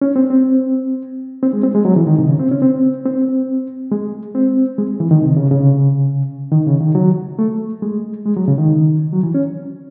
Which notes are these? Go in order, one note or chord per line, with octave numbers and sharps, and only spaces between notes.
C#4
C4
C4
C4
G#3
C4
G#3
F#3
E3
D#3
C3
C#3
C4
C#4
C4
C4
G#3
C4
G#3
E3
D#3
C3
C#3
C#3
D#3
C#3
D#3
F#3
A3
G#3
G#3
F#3
C#3
D#3
F#3
E3
C#4